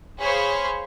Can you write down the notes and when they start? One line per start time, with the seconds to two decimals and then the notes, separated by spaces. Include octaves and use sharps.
0.18 G#4 C5 C#5 F5 B5 C#6